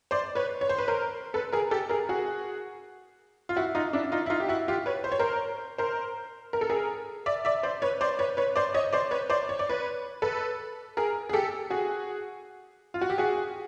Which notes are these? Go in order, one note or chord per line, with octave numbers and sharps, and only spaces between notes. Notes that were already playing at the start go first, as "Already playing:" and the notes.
C5 D5
B4 C#5
C#5
C5
B4
A#4 C5
A4 B4
G#4 A#4
G4 A4
G#4 A#4
F#4 G#4
F4
E4 F#4
D#4 F4
D4 E4
D#4 F4
E4
D#4 F4
G4
E4 F#4
F4 G4
B4 C#5
C5
C#5
A#4 C5
A#4 C5
A#4
A4
G#4 A#4
D5 E5
D5 E5
C5 D5
B4 C#5
C5 D5
B4 C#5
B4 C#5
C5 D5
C#5 D#5
C5 D5
B4 C#5
C5 D5
C#5
D5
B4 C#5
A4 B4
G#4 A#4
G#4
G4 A4
F#4 G#4
F4
F#4
G4
F#4 G#4